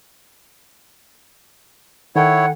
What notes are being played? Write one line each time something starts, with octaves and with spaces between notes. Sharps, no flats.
D#3 E4 A4 C#5 F#5 G5